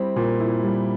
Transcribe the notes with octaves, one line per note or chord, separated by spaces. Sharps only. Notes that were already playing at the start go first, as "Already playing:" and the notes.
Already playing: G3 C4 E4
A#2
E4
G3